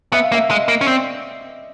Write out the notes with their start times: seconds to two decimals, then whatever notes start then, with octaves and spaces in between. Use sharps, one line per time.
0.13 B3 E5
0.23 F5
0.32 A#3 E5
0.50 G#3 D#5
0.68 A#3
0.81 C#4
0.87 C4 D5